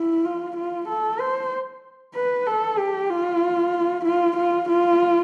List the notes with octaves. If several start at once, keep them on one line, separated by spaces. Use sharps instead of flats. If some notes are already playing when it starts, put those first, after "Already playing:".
Already playing: E4
F4
F4
A4
C5
B4
A4
G4
F4
F4
F4
F4